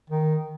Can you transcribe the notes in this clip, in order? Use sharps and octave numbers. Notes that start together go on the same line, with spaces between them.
D#3